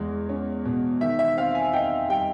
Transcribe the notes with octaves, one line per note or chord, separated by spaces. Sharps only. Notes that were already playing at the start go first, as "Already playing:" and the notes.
Already playing: E2 G#3
C#4
B2
D#3 E5
E5
C4 F5
G#5
D#4 G5
G3 G5